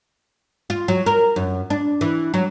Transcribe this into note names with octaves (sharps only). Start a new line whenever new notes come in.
F4
F#3
A#4
F#2
D4
E3
F#3